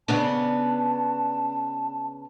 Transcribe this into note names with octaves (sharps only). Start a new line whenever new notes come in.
C#3 B3 D4 A5